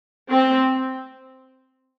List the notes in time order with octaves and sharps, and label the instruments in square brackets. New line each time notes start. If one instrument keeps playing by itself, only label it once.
[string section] C4